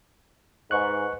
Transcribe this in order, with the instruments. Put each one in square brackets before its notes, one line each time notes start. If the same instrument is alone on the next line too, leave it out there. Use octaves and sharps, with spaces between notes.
[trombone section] G#2 [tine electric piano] B4 C#6 F#6